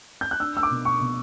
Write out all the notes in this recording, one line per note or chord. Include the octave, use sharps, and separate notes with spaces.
G6
F#6
D4 E6
E6
D6
B2
C#6
B2